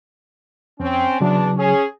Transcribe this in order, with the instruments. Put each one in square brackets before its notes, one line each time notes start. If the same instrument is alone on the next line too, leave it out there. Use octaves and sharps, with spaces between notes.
[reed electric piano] F2 [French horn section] C4 C#4
[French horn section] E2 D4 [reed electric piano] C#3 F#3
[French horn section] C#4 G#4